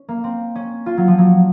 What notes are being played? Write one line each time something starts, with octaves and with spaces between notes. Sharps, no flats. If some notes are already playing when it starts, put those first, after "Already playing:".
Already playing: C#4
A#3
C4
C#4
F4
F#3
F3
F#3